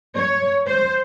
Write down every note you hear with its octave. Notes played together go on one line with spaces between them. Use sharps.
C#5
C5